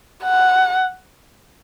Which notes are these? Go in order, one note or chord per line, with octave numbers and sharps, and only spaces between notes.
F#5